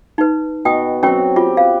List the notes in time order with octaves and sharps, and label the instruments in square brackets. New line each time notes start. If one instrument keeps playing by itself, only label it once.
[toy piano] D#4 B4
[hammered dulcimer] B2 [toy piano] G5 D#6
[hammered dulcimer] F#3 C4 [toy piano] C#4 G5
[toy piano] F4 [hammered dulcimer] G4
[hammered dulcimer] B4 [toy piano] F5